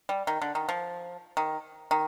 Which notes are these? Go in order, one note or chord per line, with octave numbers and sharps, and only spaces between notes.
G3
D#3
D3
D#3
F3
D#3
D#3